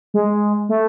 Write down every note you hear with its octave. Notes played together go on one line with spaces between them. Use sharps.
G#3
A3